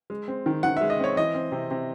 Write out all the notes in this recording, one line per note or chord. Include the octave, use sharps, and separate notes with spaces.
G#3
C4
D#3
D#3 F#5
G#3 E5
D#5
C4 C#5
E3 D#5
C4
C3
C3